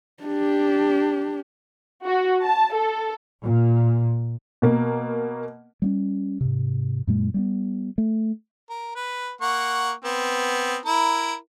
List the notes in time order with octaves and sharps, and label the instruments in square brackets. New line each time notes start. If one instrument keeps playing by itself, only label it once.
[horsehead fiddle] D4 G4
[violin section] F#4
A5
A4
[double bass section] A#2
[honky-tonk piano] B2 A#3
[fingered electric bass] G3 A#3 C#4
G#2 C3
F#2 A#2 G#3
G3 A#3 B3
A3
[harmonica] A#4
B4
A#3 F#5 C#6
B3 C4
E4 A#4